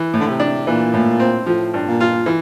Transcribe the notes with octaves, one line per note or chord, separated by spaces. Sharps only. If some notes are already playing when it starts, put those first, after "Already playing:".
Already playing: E3
A2
D3
C3
D4
A#2 E3
A2
C4
A2 F3
G2
A#2
F4
E3